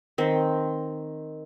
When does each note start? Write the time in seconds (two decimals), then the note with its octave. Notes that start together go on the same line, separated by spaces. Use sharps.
0.18 D#3 C4